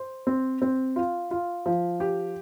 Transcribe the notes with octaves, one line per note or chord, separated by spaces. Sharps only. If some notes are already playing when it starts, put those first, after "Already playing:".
Already playing: C5
C4
C4
F4
F4
F3
G4